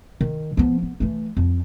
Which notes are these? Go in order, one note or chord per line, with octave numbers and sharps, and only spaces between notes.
D#3
F3 B3
B3
E3 A3
F2